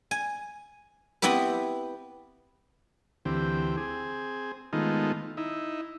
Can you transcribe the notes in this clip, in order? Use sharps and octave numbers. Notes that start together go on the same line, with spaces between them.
G#5
B3 C4 E4 G4 B4
D2 E3 C4 G4
C4 G#4
D#3 G#3 A3 B3 D#4 F4
D#4 E4